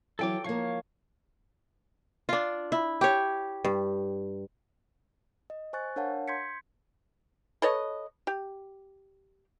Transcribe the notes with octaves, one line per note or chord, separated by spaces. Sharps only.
E3 F#3 A4 C#5 G5 D6
F3 A#3 C#5 F5 C#6
D4 F4
E4
G4 C#5
G2
D#5
C5 G#5 C#6 F#6 A6
D4 A#4 C#5 F5 F#5 A5
C6 G6 G#6 B6 C#7
A4 B4 C#5 D#5
G4